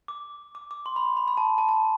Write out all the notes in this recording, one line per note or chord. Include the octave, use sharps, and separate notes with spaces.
D6
D6
D6
C6
B5
B5
B5
A5
A5
A5